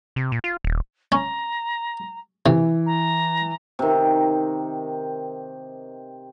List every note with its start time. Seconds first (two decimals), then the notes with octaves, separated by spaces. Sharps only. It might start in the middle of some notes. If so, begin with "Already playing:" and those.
0.16 C3
0.32 A#2
0.44 F4
0.64 D#1
1.12 C#4 A#5
2.46 C3 E3
2.86 A#5
3.79 C3 D#3